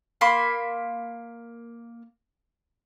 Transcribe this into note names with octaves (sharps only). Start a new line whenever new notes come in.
A#3 B5 C6